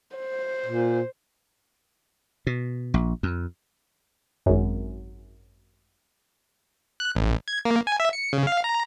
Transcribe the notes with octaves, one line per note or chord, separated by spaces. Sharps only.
C5
A#2
B2
A#1
F2
G#1 F#2
F#6
A1
G#6
A#3
G#5
E5
C#7
C#3
F5
A#5